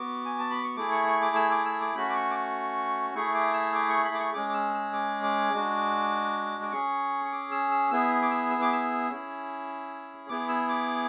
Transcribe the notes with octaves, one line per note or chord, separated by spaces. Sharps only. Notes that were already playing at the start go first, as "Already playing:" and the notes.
Already playing: B3 F#4 D6
G#5
A5
B5
C#6
A3 E4 G#4 D6
C#6
C#6
D6
E6
D6
E6
D6
A3 C#4 F#4 B5
D6
C#6
D6
C#6
A3 E4 G#4 C#6
D6
E6
D6
C#6
B5
D6
C#6
G#3 C#4 G#4 D6
D6
E6
E6
D6
D6
G#3 D4 F#4
D6
C#4 G#4 C#6
C#6
D6
E6
E6
B3 E4 G#4 E6
D6
E6
E6
D6
E6
C#4 E4 G#4
B3 E4 G#4 D6
E6
D6